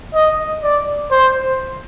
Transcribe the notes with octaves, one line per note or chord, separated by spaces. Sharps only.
D#5
D5
C5